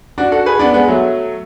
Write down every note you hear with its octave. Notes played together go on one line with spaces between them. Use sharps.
D4 F#4
F#4 A4
G#4 B4
B3 D4
G#3 B3
F#3 A3